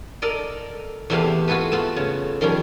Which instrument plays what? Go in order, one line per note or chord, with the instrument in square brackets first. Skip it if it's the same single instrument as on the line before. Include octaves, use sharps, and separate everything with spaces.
[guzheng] A4 A#4 D5 D#5
E2 C3 A3 B3 G4 F5
F4 F#4 G#4 A4 B4
A3 B3 F4
C#3
D#3 F3 G3 C#4